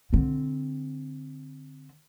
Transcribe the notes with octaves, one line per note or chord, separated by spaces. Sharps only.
D3 C4